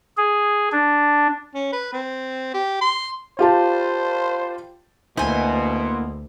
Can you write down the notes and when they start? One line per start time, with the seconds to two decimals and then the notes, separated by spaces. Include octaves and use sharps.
0.17 G#4
0.72 D4
1.54 C#4
1.73 B4
1.92 C4
2.54 G4
2.81 C6
3.39 F4 G4 C5 A5
5.17 D2 B2 A#3 E4 C5 G#5